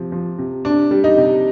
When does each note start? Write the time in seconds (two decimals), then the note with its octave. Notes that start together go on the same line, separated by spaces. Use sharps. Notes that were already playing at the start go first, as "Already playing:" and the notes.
Already playing: C3 F3
0.12 F3
0.38 C3
0.65 C3 D4
0.91 G3
1.04 D#4
1.17 C3